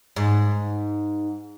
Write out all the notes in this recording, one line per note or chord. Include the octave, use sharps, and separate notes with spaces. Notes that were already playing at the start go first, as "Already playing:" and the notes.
G#2